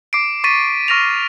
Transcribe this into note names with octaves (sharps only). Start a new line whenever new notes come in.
D6 C7 D7
C#6 A6 B6 D#7
C#6 F6 A#6 B6 F7